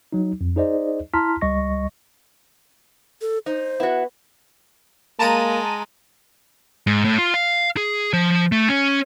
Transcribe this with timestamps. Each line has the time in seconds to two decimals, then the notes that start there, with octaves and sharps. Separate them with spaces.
0.13 F#3 D#4
0.41 F2
0.56 D#4 G#4 C5 D5 D#5
1.13 E4 A5 A#5 C6 F6 B6
1.41 C#2 G3 D#5 C#6 A#6
3.21 A4
3.46 D#4 C5
3.80 B3 E4 F#4
5.19 G#3 A#3 A5 A#5 D#7
6.87 G#2
7.05 A2
7.18 F4
7.34 F5
7.77 G#4
8.13 F3
8.52 A3
8.69 C#4